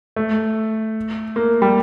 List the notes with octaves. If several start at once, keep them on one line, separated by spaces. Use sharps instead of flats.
A3
A#3
G3